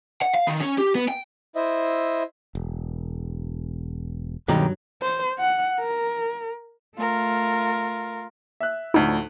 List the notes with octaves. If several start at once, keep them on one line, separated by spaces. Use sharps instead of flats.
F#5
F5
D#3
C#4
G4
B3
G5
E4 C5 D#5 E5
E1
B1 G2 D#3 F#3 G3
C5
F#5
A#4
A3 F4 A#4
E5 F#6
D2 A2 F3 D#4